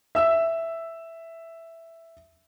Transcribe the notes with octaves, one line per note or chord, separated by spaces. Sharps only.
E5 E6